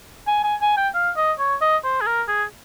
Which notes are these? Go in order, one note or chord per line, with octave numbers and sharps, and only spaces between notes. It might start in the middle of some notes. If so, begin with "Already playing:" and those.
G#5
G#5
G#5
G5
F5
D#5
C#5
D#5
C5
G#4
A#4
G#4